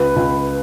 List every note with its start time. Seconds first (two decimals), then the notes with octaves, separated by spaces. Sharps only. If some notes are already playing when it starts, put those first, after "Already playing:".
Already playing: C#2 B4
0.16 C#2